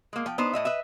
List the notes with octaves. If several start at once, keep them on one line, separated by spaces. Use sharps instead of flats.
G#3 A#3
F3 G5
B3 D4 D#4 C5
A2 D#5 E5
B4 D#5 E5